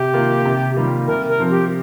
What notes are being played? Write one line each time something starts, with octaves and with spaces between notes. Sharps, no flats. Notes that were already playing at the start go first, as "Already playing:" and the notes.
Already playing: C3 G4
D#3 A#3 F4
C3
D#3 G3 A#3 F4
C3 A#4
A#4
F3 C4
G4